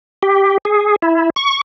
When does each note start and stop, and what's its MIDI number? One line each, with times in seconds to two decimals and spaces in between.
0.23 0.58 67
0.65 0.96 68
1.02 1.30 64
1.36 1.61 85